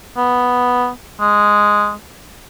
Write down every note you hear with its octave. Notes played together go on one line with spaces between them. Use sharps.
B3
G#3